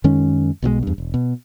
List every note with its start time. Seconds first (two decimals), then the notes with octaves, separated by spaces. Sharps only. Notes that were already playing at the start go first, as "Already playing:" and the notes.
0.04 F#2 D#3 G#3 C#4
0.62 B1 B2 D3 G#3
0.83 E2 G2
0.98 E1
1.14 B2